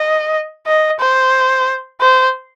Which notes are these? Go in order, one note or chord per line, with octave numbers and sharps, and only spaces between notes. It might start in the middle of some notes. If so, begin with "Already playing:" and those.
Already playing: D#5
D#5
C5
C5